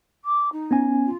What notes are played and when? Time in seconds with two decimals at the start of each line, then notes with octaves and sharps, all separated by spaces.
0.25 D6
0.52 D#4
0.71 B3 C#4 G#5
1.05 F4